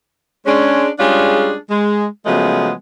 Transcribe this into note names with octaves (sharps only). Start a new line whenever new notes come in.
G#3 C#4 D4
G3 G#3 C#4 D4 F4 G#4
G#3
C#3 F3 F#3 G#3 A3 B3